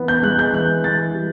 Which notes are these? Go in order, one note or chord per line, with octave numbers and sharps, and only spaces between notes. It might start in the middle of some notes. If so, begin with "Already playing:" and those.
Already playing: E3 B3
G6
G#3 F#6
G6
E3 F#6
E3 A6
G3